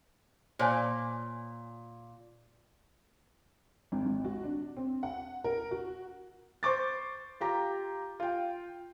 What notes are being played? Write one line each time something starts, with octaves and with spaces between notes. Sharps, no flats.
A#2 C5 C#5 G#5
G#1
G#1
F#4
D4
C4
F#5
A#4
F#4
C5 C#6 D6 A6
F4 G4 A#5
F4 G5